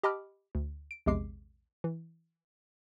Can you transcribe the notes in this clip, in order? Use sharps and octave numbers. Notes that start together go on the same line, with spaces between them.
G4 D#5 A5 B5 D6 F6
D2
D7
A#1 E2 C3 G#3 D6 C7
E3